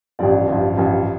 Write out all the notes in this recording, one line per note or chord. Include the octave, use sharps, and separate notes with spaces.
A1 G2 F3 D5
A1 G2 F3
A1 G2 F3